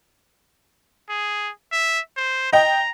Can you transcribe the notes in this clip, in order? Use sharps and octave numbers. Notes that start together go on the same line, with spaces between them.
G#4
E5
C5
D#5 G5 A#5